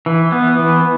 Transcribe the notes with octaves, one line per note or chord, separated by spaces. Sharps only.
E3
B3
E3